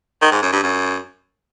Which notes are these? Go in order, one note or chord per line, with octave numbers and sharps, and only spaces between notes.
D#3
G#2
F#2
G2
F#2